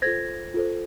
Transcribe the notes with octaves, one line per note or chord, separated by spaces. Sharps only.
F4 A4 C5 G#6 A#6
F4 A4 C5